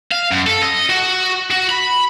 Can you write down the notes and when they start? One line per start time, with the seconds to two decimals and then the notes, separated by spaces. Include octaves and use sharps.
0.12 F5
0.31 F#2
0.46 A4
0.63 D#5
0.89 F#4
1.51 F#4
1.69 B5